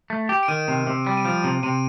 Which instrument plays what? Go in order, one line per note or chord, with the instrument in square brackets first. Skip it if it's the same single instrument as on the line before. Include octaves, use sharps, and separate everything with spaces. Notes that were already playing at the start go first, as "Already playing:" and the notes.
[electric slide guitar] A3
G4
[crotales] D7
[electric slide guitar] D#3 [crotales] D#7
[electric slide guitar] C3
C3
G3
[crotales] D#7
[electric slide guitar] F3 [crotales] D7
[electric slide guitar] C3
[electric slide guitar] C3 [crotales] D#7